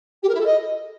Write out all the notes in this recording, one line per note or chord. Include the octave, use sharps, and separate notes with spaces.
G4
A#4
E4
A4
D#5